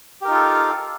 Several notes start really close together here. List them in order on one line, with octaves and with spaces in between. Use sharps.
G4 A#4 D#4 F4 A4